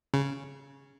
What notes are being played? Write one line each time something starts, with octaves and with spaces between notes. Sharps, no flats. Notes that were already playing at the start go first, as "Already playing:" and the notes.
C#3